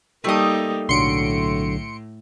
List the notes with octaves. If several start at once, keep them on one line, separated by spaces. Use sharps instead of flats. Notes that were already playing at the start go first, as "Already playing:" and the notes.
G3 A3 A#3 D#4 D#6
B1 A2 D3 F#3 C6 C#7 D7